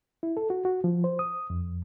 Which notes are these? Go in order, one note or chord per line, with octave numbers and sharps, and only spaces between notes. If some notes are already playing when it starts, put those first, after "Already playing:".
E4
A4
F#4
F#4
F3
C5
D#6
F2